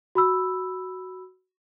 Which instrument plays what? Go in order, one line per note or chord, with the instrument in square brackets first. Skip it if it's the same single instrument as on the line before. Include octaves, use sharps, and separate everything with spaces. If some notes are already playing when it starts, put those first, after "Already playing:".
[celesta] F#4 B5 E6